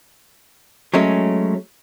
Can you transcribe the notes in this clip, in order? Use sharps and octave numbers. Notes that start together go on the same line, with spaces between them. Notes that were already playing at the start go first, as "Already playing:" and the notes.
F#3 G#3 A3 C#4